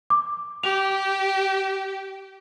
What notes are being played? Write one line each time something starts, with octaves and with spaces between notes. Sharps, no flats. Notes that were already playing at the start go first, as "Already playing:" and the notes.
D6
G4 F7